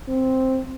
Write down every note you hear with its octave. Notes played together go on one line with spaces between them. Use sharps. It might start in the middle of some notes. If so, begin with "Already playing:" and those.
C4